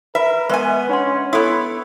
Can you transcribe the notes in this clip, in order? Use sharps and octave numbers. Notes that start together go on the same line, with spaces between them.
A#4 B4 E5 B5
G#3 B3 B4 E5 G#5 C#6
C#4 D4 F#5 C6
B3 E4 A4 C#5 C6